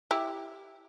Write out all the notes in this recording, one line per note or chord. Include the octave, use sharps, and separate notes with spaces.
E4 G4